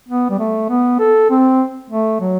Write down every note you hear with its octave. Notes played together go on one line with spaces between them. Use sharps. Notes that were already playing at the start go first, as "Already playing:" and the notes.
B3
G3
A3
B3
A4
C4
A3
F#3